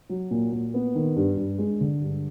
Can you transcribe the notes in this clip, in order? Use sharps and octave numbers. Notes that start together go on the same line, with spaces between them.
F#3
A#2
A#2
B3
D#3
G2
G2
G#3
D3
G2